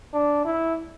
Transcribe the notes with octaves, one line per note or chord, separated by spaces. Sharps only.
D4
E4